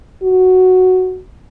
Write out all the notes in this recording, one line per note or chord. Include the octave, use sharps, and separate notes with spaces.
F#4